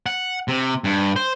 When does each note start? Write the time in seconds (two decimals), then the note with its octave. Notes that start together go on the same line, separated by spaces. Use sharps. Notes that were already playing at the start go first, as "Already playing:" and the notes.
0.06 F#5
0.48 C3
0.84 G2
1.16 C5